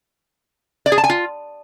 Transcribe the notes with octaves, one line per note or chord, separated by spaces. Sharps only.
D5
G#4
A5
G#5
F4